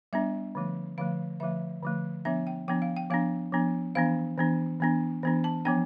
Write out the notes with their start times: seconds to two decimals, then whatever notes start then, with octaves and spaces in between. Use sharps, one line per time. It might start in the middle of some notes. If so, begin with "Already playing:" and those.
0.13 G3 B3 D4 E5
0.55 D3 F3 A3
0.98 D3 F3 A3 F5
1.40 D3 F3 A3 E5
1.83 D3 F3 A3
2.25 F3 B3 D4 E5
2.47 G5
2.68 F3 B3 D4 G5
2.82 F5
2.97 G5
3.10 F3 B3 D4 F5
3.52 F3 B3 D4
3.95 E3 B3 D4 F5
4.38 E3 B3 D4
4.80 E3 B3 D4
5.23 E3 B3 D4
5.44 A5
5.65 F3 B3 D4 G5